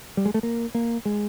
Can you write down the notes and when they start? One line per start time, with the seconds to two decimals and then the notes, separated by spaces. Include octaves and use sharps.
0.17 G3
0.25 G#3
0.34 A3
0.43 A#3
0.75 A#3
1.05 G#3